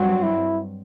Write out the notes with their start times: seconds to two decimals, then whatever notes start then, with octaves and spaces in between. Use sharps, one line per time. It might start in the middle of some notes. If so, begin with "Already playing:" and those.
Already playing: G2 F#3 C4 F#4
0.23 E4